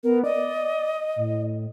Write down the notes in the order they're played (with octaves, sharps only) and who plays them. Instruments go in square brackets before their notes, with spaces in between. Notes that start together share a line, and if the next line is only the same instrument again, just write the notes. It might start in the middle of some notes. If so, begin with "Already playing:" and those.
[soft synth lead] B3 [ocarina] A#4
[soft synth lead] D5 [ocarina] D#5
[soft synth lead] A2